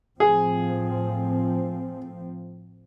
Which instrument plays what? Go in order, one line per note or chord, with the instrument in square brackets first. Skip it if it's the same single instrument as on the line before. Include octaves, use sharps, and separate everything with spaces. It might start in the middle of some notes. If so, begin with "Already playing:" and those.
[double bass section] A2 F3 C4 [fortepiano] G#4